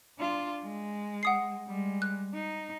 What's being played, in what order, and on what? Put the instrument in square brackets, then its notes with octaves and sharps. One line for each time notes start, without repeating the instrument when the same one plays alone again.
[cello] D4 F4
G#3
[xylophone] F#5 D#6 C7
[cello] G3 G#3
[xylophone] F#6
[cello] D#4